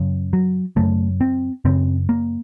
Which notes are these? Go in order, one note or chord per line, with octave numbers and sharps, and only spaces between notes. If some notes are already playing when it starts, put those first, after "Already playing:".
Already playing: F#2 C#3
F#3
F#2 C#3 A3
C4
F#2 C#3 C4
A#3